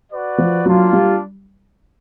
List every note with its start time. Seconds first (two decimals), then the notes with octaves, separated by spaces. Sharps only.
0.10 F#4 B4 D5
0.38 F3
0.65 F#3 A#3 D4 F4
0.93 G3